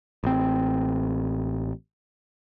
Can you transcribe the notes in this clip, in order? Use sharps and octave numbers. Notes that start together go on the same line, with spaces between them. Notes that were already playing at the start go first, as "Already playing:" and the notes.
A1 C4